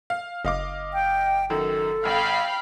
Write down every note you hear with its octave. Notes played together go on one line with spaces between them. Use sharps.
F5
F#1 D#5 F5 D6
G5
F#2 D#3 A4
G#1 F5 G5 B5 F6